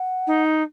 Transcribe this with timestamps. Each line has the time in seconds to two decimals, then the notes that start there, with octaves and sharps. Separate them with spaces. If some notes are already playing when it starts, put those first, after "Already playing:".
Already playing: F#5
0.27 D#4